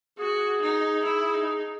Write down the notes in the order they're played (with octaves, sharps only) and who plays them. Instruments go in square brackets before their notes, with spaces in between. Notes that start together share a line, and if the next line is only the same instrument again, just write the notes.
[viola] F#4 [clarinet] G#4
[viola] D#4
E4
D#4